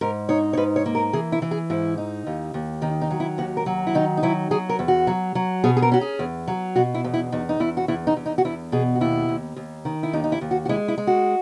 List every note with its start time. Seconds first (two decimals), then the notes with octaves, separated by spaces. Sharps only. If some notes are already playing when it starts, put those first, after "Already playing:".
0.01 G#2 A#4
0.29 D#4 C#5
0.53 C#5
0.57 G#2 B4
0.76 C#5
0.86 A#3
0.95 A#4
1.13 E3 G#4
1.32 E4
1.42 E3
1.51 G#4
1.70 G#2 E4
1.98 D#4
2.27 D#2
2.54 D#2
2.82 D#3 D#4
3.01 D#4
3.10 F#3
3.20 E4
3.38 D#2 F#4
3.57 A#4
3.66 F#3
3.87 E4
3.95 D#3 D#4
4.17 D#4
4.23 F#3 E4
4.51 F#3 G#4
4.69 A#4
4.79 E2
4.88 F#4
5.07 F#3
5.35 F#3
5.64 B2 G#4
5.77 G#4
5.82 A#4
5.92 C#4 F#4
6.01 G#4
6.19 E2
6.48 F#3
6.76 B2 F#4
6.95 E4
7.04 E2
7.14 E4
7.32 E2 D#4
7.49 D#4
7.60 E2 E4
7.77 F#4
7.88 E2 E4
8.07 D#4
8.16 E2
8.26 D#4
8.38 F#4
8.45 E2 E4
8.72 B2 G#4
8.95 F#4
9.01 D#2 E4
9.29 D#2
9.56 D#2
9.85 D#3
10.03 E4
10.13 D#2 D#4
10.24 D#4
10.32 E4
10.41 D#2
10.51 F#4
10.65 F#4
10.69 G#3 E4
10.88 E4
10.98 G#3
11.07 F#4